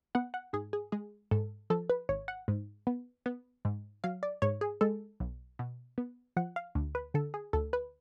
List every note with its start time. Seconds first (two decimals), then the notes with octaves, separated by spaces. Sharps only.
0.15 B3 F#5
0.34 F#5
0.53 G#2 G#4
0.73 G#4
0.92 G#3 G#4
1.31 G#2 A4
1.70 F3 A4
1.90 B4
2.09 G#1 C#5
2.28 F#5
2.48 G#2
2.87 B3
3.26 B3
3.65 G#2
4.04 F#3 F5
4.23 D5
4.42 G#2 C#5
4.61 G#4
4.81 G#3 A4
5.20 B1
5.59 B2
5.98 B3
6.37 F3 F#5
6.56 F5
6.75 D2
6.95 B4
7.14 D3 A4
7.34 G#4
7.53 D2 A4
7.73 B4